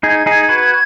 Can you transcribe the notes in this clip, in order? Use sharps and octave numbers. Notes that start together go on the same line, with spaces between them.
D#4 G#4 G#6
D#4 G#4
F#4 B4